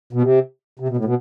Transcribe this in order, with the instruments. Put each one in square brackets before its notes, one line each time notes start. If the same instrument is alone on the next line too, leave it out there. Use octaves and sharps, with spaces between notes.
[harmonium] B2
C3
C3
B2
A2
B2